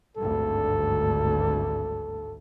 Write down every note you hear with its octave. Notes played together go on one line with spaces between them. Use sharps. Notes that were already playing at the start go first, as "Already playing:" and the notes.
G#1 D2 G2 A4